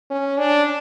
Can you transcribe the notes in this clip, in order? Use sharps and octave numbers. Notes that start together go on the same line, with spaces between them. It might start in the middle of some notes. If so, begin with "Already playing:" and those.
C#4
D4